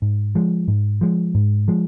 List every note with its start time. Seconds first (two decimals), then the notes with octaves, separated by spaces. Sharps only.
0.02 G#2
0.35 F3 G#3
0.68 G#2
1.01 F3 G#3
1.35 G#2
1.68 F3 G#3